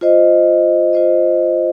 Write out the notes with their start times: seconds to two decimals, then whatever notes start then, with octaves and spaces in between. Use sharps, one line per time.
0.01 F4 C5 D#5
0.93 F4 C5 D#5